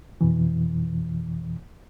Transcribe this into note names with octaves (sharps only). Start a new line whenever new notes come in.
F2 B2 E3